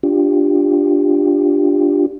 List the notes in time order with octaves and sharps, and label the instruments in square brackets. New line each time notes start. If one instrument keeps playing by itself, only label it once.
[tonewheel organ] D4 F4 G4